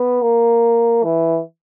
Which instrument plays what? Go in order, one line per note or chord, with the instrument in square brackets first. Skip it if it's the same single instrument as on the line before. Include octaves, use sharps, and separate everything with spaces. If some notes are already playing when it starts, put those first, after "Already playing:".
Already playing: [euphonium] B3
A#3
E3